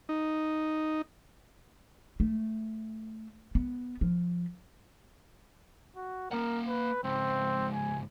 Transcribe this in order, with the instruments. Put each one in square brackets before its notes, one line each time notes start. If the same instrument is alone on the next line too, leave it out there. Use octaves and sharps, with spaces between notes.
[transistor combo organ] D#4
[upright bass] A3
B3
F3
[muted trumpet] F#4
[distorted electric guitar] A#3 F#5 [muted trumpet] A#4
[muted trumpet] B4
[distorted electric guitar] C#2 G#2 [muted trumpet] C4
[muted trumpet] G#5